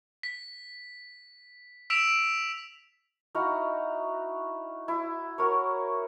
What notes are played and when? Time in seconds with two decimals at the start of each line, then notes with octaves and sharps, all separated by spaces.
0.23 B6
1.90 E6 B6 D7 E7 F7
3.35 D#4 E4 F#4 F5
4.88 E4
5.38 F#4 A#4 C#5